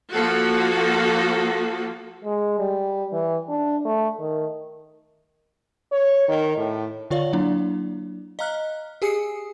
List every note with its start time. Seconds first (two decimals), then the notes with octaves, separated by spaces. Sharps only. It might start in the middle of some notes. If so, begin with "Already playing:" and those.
0.12 F3 A#3 F#4 A4
2.24 G#3
2.59 G3
3.13 E3
3.49 D4
3.85 A3
4.20 D#3
5.92 C#5
6.28 D#3
6.57 A2
7.10 D3 F4 C#5 D5 F5
7.33 F#3 A#3 D4 E4
8.39 D#5 F5 A#5 F6 F#6
9.02 G4 G#4 G#5 D#6 C7 C#7